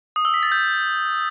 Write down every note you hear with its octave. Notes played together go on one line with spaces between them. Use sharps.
D#6
E6
B6
A6
G6